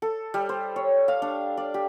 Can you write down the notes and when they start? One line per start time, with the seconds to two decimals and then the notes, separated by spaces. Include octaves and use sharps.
0.02 A4
0.34 G3
0.49 C5
0.76 C#5
1.08 F5
1.22 D4
1.57 D5
1.74 G4